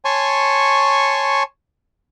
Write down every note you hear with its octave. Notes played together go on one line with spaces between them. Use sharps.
C#5 G#5 A5 C6 C#6